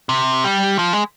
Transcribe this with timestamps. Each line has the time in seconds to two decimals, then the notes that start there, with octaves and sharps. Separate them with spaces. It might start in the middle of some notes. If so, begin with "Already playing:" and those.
0.09 C3
0.44 G3
0.79 F3
0.93 G#3